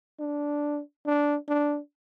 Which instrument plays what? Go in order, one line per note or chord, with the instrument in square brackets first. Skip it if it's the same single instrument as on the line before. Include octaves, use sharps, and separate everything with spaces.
[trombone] D4
D4
D4